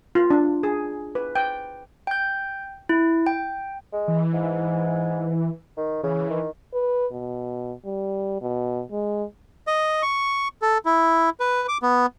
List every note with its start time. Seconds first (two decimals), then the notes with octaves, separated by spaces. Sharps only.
0.15 F4
0.30 D4
0.63 G#4
1.15 B4
1.35 G5
2.07 G5 G6
2.89 E4
3.26 G5
3.93 G#3
4.08 E3
4.33 G#2
5.77 D#3
6.03 C#3 E3
6.30 D#3
6.74 B4
7.12 B2
7.85 G3
8.41 B2
8.91 G#3
9.67 D#5
10.02 C#6
10.62 A4
10.85 E4
11.40 B4
11.68 D6
11.82 B3